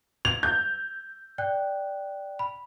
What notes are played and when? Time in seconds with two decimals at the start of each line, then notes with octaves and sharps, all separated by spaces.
0.25 G#6 F7
0.43 G6
1.38 D5 G5 F#6
2.39 B5